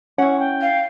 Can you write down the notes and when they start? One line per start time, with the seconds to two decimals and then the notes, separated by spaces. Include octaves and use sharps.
0.18 C#4 E4 F#5 C#6
0.40 G5
0.61 F5